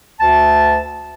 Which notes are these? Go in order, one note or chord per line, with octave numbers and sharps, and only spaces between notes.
D2 A5